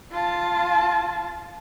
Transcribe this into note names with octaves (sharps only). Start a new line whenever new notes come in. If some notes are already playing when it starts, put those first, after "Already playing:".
F4 A5